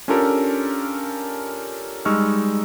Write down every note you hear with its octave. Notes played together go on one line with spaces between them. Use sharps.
C#4 D4 F4 G4 A4 A#4
G3 G#3 D#4 C#6 E6 F6